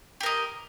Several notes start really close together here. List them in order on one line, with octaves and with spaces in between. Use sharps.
G4 A#4 D#5